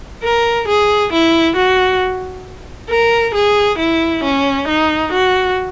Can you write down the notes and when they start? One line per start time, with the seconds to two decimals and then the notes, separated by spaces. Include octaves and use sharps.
0.23 A#4
0.68 G#4
1.13 E4
1.57 F#4
2.90 A#4
3.35 G#4
3.78 E4
4.23 C#4
4.68 D#4
5.12 F#4